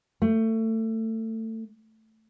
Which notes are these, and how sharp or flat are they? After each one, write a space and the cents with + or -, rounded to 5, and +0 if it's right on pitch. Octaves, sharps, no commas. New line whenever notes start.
A3 +25